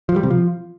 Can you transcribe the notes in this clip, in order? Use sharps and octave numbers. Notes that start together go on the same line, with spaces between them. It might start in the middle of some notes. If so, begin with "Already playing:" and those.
F3
G3
C3
F3